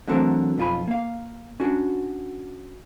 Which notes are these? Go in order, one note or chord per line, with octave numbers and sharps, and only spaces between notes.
D3 E3 F#3 A3 C4 A#4
B1 F2 F4 G#5 B5
A#3 F5
C#4 D4 F#4